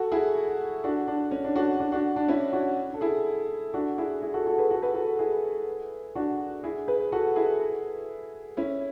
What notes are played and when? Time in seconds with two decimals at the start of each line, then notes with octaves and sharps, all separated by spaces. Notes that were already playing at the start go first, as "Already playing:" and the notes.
Already playing: F#4 A4
0.12 E4 G#4
0.84 D4 F#4
1.07 D4
1.31 C#4
1.44 D4
1.55 D4 F#4
1.80 D4
1.92 D4 F#4
2.16 D4
2.28 C#4 E4
2.53 D4 F#4
2.94 A4
3.01 E4 G#4
3.74 D4 F#4
3.98 E4 G#4
4.22 E4 G#4
4.34 F#4 A4
4.47 F#4 A4
4.58 G#4 B4
4.70 F#4 A4
4.82 G#4 B4
4.94 F#4 A4
5.19 E4 G#4
6.15 D4 F#4
6.64 E4 G#4
6.88 G#4 B4
7.12 F#4 A4
7.36 E4 G#4
8.57 C#4 E4